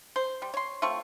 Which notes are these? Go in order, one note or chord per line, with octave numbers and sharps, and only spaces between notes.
C5
G3
C#5 C6
A3 C4 F4 C#6